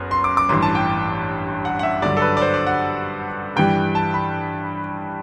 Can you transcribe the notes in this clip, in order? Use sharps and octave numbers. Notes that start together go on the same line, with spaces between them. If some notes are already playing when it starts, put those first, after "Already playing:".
Already playing: F#1 F#2 B3
C6
D6
D6
A1 G2 E3 C6
A5
G5
F#5
F#5
E5
G2 D3 F#3 D5
A4
B4
D5
C5
D5
F#5
G2 E3 G3 G5
A5
B5